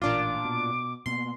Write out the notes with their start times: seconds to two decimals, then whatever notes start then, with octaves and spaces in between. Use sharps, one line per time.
0.02 A1 A#2 D4 F4 D6
0.45 B2
1.06 B2 A#3 B3 C6